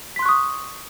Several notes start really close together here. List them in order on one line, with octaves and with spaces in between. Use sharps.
B6 C6 F#6 C#6 D#6